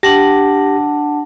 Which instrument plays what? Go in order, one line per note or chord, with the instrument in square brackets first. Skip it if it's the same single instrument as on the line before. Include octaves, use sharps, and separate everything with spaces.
[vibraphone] D4 F#5 A5 [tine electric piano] G4 A#6